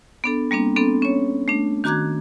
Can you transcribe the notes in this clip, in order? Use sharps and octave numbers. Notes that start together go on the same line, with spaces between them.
B3 D4 A4
G3 A#3 C4 D4
B3 C4 D4 A4
C#4 C#5
A3 D4
D#3 F#4 A#5 D6 F#6 G#6